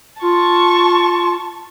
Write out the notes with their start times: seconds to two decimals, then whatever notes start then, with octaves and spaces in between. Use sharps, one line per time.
0.22 F4 A5 C#6